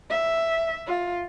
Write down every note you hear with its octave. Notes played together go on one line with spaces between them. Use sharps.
E5
F4